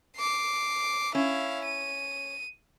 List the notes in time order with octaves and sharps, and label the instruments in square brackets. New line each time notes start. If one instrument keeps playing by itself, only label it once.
[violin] D6 C7
[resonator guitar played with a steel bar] C#4 [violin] E4 F5
[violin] D#7